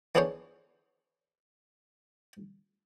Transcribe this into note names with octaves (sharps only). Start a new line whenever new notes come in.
E3 B3 D4 G#4 C5 C#5